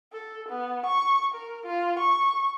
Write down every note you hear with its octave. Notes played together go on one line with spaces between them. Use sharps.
A4
B3
C#6
A#4
F4
C#6